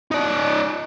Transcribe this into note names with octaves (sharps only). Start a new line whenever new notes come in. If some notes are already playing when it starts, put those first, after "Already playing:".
D#4 D5